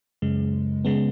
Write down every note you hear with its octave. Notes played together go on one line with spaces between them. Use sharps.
F#2 C#3 G#3
C#3 G#3 B3